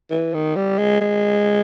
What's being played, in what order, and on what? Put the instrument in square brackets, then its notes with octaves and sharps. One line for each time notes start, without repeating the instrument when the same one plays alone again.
[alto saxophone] E3
D#3
G3
G#3
G#3